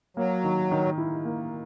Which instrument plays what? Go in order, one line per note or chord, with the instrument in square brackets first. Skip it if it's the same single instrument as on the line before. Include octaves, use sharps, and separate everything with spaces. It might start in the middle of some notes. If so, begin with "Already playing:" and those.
[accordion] F#3 [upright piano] A#3
[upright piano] D#3
D#3
E4
A#3